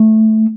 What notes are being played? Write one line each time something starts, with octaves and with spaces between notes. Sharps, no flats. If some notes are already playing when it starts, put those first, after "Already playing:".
Already playing: A3